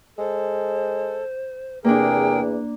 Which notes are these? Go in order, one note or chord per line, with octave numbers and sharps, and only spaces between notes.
G#3 A4 C5
E2 C3 A#3 D4 G#4 A#4 G5